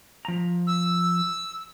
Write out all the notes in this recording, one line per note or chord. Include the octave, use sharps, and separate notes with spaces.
F3 A#5
E6